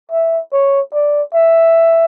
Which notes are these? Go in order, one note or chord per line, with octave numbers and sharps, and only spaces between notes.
E5
C#5
D5
E5